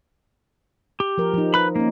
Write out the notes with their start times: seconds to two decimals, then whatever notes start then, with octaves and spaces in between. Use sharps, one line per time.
1.00 G4
1.18 F3 A#4
1.34 F3 D#4
1.54 B4 B5
1.76 A#3 C#4 D#4